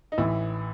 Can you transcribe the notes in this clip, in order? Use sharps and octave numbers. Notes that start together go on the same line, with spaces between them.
D#4
A1 A2 E3 E4